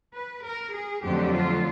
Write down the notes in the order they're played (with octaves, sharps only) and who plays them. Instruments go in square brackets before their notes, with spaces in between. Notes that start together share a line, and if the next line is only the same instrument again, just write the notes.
[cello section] B4
A#4
G#4
F2 D3 F#3 A3 G4
F4